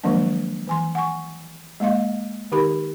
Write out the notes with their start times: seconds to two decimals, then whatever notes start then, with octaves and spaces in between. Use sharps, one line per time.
0.04 D#3 F3 F#3 G#3 A#3 D4
0.67 E3 G#5 C6
0.95 F#5 G#5 C#6
1.80 G#3 A#3 D#5 F5
2.52 D#3 D#4 G4 A#4 B5